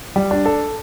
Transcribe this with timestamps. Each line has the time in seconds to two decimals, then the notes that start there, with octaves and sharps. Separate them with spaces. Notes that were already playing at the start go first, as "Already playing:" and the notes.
0.16 G3
0.31 D4
0.46 A4